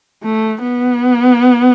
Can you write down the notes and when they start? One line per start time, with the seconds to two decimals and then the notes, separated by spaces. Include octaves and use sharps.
0.23 A3
0.62 B3